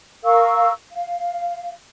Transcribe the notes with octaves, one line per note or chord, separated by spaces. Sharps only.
A#4 F5 C#6 E6
F5